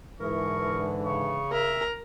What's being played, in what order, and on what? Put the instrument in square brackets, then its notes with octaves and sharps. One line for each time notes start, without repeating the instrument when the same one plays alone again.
[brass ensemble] G#2 D3 E3 [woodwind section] E4 G#4 A#4 [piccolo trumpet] C#6
[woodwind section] C#3 [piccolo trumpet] C#6
[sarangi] A#4 [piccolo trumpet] E5